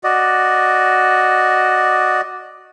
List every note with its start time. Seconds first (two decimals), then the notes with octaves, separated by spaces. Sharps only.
0.04 F#4 D5 D#5